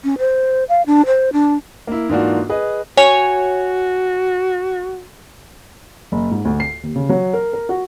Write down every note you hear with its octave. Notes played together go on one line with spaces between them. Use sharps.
C#4
C5
F5
D4
C5
D4
A#3 E4
G#2 E3 A#3 D4 F4 F#4
G#4 B4 D#5
F#4 C#5 G#5
F#1
G#2
D2
C7
D#2
C#3
F#3
A#4
A#4
F#4